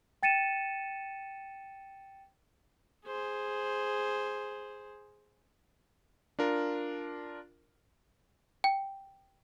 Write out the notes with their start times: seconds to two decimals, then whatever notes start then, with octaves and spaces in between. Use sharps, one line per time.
0.23 G5 A6 C#7 D#7 E7
3.06 G#4 C5
6.39 D4 F4 A#4
8.64 G5